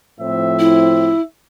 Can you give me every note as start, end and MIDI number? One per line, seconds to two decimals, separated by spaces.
0.21 1.13 45
0.21 1.13 53
0.21 1.13 60
0.21 1.25 76
0.59 1.21 64